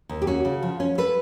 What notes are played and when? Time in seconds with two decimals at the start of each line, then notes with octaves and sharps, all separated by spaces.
0.09 D#2
0.22 G4
0.27 C#4 F#4
0.45 C#3
0.63 F3
0.80 C#4
0.98 A4 B4